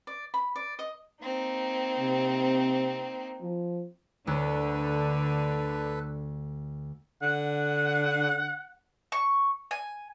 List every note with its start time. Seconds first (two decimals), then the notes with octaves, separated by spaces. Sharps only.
0.07 D5
0.34 B5
0.56 D5
0.79 D#5
1.22 A#3 C4 D#4
1.99 C3
3.42 F3
4.27 D2 D3 A4 B4
7.22 D3 F#5
9.12 C#6
9.71 G#5